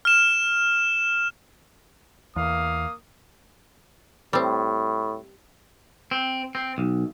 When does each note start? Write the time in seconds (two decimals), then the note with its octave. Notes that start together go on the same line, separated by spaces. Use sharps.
0.05 F6 E7
2.36 E2 A#3 F5 D#6
4.33 A2 G3 C4
6.11 C4
6.55 C4
6.78 B1